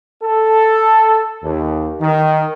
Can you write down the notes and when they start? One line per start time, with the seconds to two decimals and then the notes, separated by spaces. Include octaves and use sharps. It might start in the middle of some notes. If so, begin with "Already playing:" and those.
0.23 A4
1.44 D#2
2.01 D#3